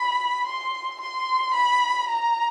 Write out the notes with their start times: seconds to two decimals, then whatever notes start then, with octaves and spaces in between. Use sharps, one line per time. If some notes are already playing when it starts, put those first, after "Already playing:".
Already playing: B5
0.47 C6
1.01 C6
1.54 B5
2.09 A#5